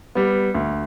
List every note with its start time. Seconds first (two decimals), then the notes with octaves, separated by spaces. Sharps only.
0.15 G3 B3
0.55 D2